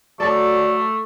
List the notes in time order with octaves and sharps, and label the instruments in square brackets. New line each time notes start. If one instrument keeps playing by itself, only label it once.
[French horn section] F#3 [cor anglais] A3 [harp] A4 A5 D6 [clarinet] D5